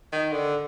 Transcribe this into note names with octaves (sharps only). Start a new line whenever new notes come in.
D#3
D3